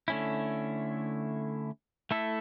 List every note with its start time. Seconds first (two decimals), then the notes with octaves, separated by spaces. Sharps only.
0.08 D3 A3 C#4 E4
2.11 A3 E4 A4 E5